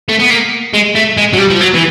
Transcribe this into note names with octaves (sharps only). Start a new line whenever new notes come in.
A3
B3
A#3
G#3
A3
G#3
F#3
G3
F3
F#3
E3